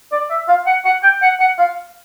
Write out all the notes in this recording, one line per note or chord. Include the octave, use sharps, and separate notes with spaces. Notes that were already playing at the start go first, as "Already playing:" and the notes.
D5
E5
F5
F#5
F#5
G5
F#5
F#5
F5